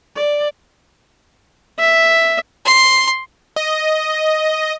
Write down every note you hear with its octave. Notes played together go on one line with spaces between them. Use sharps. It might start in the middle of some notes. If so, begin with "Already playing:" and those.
D5
E5
C6
D#5